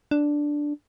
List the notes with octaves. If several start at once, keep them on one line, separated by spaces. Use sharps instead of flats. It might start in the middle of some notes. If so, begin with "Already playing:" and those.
D4